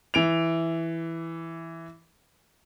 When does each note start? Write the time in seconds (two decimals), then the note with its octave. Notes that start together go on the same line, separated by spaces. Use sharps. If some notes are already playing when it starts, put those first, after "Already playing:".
0.14 E3 D7 F7